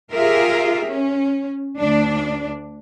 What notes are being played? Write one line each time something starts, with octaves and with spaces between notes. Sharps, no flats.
F4 G4 G#4 A#4 E5
C#4
D2 D4